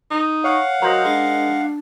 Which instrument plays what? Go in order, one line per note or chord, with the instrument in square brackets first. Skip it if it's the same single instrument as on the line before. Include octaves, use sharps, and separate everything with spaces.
[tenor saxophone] D#4
[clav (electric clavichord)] C#5 [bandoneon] F5 F#5
[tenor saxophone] F#3 [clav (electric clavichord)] A#4 C5 D#5
[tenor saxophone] G#3 [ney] D4